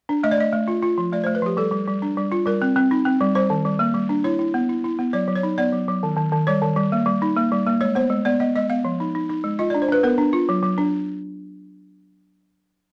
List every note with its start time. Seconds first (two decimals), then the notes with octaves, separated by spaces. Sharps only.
0.09 D4
0.23 A3 D#5
0.31 D5
0.38 A3 D#5
0.53 A3
0.68 F4
0.83 F4
0.98 F3
1.12 A3 D5
1.24 A3 C5
1.35 B4
1.42 F3 G4
1.57 G3 A4
1.71 G3
1.87 G3
2.02 D4
2.17 G3
2.32 F4
2.46 G3 A#4
2.62 C4
2.76 C4
2.91 D#4
3.05 C4
3.21 G3
3.35 G3 C5
3.50 D#3
3.65 G3
3.79 A#3
3.94 G3
4.09 D4
4.24 E4 C#5
4.39 E4
4.54 B3
4.69 E4
4.84 E4
4.99 B3
5.13 F#3 D5
5.28 F#3
5.36 C#5
5.43 D#4
5.58 B3 D5
5.73 F#3
5.88 F#3
6.03 D#3
6.17 D#3
6.32 D#3
6.47 G3 C#5
6.62 D#3
6.76 G3
6.92 A#3
7.06 G3
7.22 D#4
7.37 A#3
7.52 G3
7.66 A#3
7.81 G#3 C#5
7.95 B3 C5
8.10 G#3
8.25 B3 D5
8.40 B3 D#5
8.55 G#3 D#5
8.70 B3 F5
8.85 F3
9.00 D#4
9.15 D#4
9.29 D#4
9.44 G#3
9.59 F4 D#5
9.70 D4 D5
9.82 C5
9.88 D4 B4
10.03 B3 A#4
10.18 D4
10.33 F4
10.49 F#3
10.63 F#3
10.78 D4